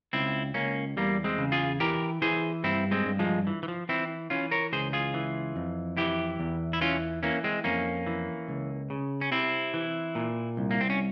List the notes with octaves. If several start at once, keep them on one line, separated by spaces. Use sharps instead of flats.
C#2 C4 E4
C#2 A#3 C#4
E2 G3 A#3
G#3 C4
C#3
F4 G#4
E3 G4 A#4
E3 G#4 C5
G2 C4 E4
G#3 C4
G2
F3 G#3
E3
E3
F3
E3 C4 E4
E3 C#4 F4
A#4 C#5
C#2 G#4 C5
F4 G#4
E3
F2
E3 E4 G4
E2
E4
E3 C#4 F4
E3 A#3 C#4
G#3 C4
F2 A#3 C#4
E3
C#2
C#3
C#4
C3 C4 E4
E3
A#2
C2
A#3
C4
C#4